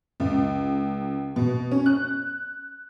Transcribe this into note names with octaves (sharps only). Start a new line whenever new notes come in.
C#2
B2
C#4
F#6